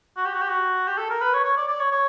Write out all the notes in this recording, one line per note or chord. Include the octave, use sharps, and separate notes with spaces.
F#4
G4
F#4
G4
F#4
G4
A4
A#4
B4
C#5
C#5
D5
D5
C#5
C#5